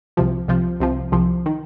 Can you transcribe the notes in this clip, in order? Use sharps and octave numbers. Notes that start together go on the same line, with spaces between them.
C2 C3 F3
C2 C3 F3
C2 C3 F3
C2 C3 F3
D#3